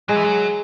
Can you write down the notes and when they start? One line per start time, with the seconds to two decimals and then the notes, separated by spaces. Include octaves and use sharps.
0.09 F#3 G#3
0.17 E3
0.24 F#3